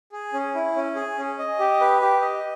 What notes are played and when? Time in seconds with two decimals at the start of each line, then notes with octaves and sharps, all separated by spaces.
0.12 G#4
0.33 C#4
0.55 E4
0.76 C#4
0.96 G#4
1.17 C#4
1.39 D#5
1.59 G4
1.81 B4
2.01 G4
2.22 D#5